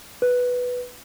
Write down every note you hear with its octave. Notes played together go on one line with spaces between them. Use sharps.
B4